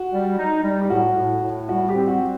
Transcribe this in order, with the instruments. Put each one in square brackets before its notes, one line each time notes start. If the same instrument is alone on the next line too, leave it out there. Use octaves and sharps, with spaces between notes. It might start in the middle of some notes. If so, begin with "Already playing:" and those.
Already playing: [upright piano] F#4
[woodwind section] G3
D#4
G3
[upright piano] G4
[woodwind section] A2 [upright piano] F#4
[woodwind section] A2
A2
[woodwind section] G3 [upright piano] F#4
[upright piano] G4
[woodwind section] C4
[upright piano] F#4
[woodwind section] G3